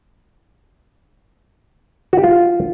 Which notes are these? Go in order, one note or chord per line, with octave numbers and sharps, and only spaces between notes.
F#4
G4
F4